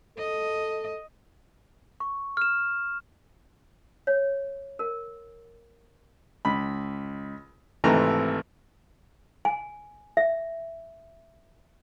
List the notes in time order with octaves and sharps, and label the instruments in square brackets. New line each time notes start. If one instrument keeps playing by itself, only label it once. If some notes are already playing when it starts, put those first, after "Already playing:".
[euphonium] A4 [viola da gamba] D#5
[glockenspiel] C#6
F6 E7
[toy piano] C#5
A#4
[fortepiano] C#2 B5
G#1 C3 E3 A3 A#5
[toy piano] G#5
E5